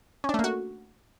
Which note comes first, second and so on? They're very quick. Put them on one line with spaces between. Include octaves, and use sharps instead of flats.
C#4 D4 A3 A#3 F#4